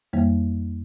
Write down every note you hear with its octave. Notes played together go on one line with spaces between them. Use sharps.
F2 D#3 G3 A#3